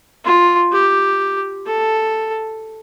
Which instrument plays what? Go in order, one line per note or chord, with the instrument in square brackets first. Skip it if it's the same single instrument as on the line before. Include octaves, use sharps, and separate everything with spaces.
[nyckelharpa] F4
G4
A4